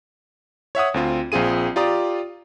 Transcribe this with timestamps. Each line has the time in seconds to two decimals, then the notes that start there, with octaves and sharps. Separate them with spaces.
0.75 C#5 E5 F#5 D#6
0.94 D2 C4 F4
1.32 A#1 C4 F4 G#4 D#7
1.76 F4 G4 D5 A#5 D#6